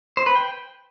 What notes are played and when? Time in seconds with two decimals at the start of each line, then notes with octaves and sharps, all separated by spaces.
0.17 C5
0.26 B4
0.35 G5